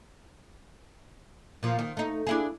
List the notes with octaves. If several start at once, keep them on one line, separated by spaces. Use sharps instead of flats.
A#2 F3
D#3
A3 D#4
D4 E4 G#4